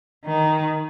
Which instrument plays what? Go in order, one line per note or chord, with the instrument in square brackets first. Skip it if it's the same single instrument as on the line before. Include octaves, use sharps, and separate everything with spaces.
[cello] D#3